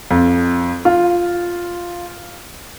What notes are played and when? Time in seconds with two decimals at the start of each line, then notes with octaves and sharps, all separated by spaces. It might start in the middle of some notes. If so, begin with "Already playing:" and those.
0.11 F2
0.85 F4